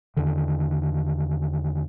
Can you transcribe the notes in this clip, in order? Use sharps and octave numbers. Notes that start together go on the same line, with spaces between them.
E2 D3 D#3